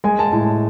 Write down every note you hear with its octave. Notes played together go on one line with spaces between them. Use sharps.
G#3 G#5
A5
A2 A5